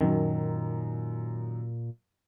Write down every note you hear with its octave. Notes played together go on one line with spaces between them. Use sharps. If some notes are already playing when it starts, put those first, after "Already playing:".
F#2 A#2 D#3 F#3